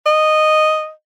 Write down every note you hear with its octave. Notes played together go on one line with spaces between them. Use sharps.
D#5